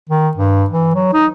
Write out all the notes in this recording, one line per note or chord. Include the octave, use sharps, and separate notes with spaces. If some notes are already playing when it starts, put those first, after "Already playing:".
D#3
G2
E3
F#3
D#4